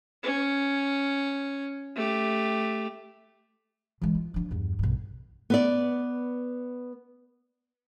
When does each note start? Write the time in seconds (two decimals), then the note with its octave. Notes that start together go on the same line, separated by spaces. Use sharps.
0.23 C#4
1.96 A3 G4
4.02 E3 G#3
4.15 F4
4.34 F3 D4
4.51 E2 G2
4.79 B1 G2
5.50 B3 B4 D5